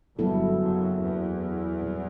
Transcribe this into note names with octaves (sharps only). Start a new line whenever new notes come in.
G1 G2 F#3 B3 E4 A4
F#1 F#2
E2
A#2 G3 C4